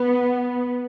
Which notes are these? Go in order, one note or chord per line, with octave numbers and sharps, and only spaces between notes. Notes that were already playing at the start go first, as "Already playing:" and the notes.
Already playing: B3